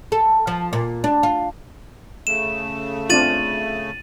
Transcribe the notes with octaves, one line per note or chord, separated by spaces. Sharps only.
A4
F3
A#2
D4
F4
C#3 A3 E7
C4 D4 F4 A6 D#7 F#7